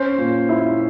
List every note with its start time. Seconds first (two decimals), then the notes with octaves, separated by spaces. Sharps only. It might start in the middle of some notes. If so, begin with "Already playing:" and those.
Already playing: C#4 C5
0.18 A#2
0.49 E4